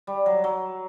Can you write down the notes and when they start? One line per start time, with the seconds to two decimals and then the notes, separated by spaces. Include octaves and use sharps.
0.07 G3
0.26 F#3
0.44 F#3